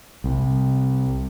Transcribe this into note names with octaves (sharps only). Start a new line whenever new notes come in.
C2